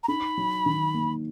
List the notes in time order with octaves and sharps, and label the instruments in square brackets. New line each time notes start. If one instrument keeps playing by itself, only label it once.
[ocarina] A#5
[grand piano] D#4 [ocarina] B5
[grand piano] F#3
D#3
A#3